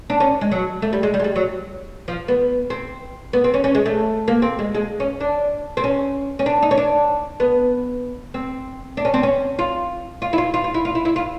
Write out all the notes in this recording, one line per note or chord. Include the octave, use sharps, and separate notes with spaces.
D4
C#4
G#3
F#3
A3
G3
G#3
G3
G#3
G3
F#3
F3
B3
C4
B3
C4
C#4
C#4
G#3
A3
A#3
C4
G#3
G#3
C#4
D4
C4
C#4
C#4
D4
D#4
C#4
D4
B3
C4
D4
C#4
C4
C#4
F4
F4
E4
F4
F4
F4
E4
F4
E4
E4
F4